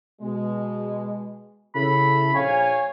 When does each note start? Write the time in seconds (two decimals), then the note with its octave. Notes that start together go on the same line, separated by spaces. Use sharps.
0.21 B2 G#3
1.75 C#3 E4 A4 B5
2.34 A#1 C#5 F5 G#5